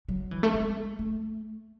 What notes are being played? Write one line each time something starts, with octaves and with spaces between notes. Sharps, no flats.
F#3
E3
A3
G#3
A3